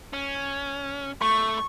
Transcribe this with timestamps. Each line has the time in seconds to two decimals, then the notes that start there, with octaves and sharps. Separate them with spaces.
0.13 C#4
1.22 A3 C#6